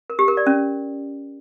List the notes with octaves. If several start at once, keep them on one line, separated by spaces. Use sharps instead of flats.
A#4
G4
A#4
D5
C#4